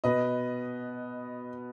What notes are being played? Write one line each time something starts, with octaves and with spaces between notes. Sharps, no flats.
B2 B4 D#5